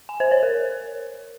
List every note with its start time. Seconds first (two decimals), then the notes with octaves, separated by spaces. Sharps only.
0.09 G#5
0.20 C5
0.31 C#5
0.43 A#4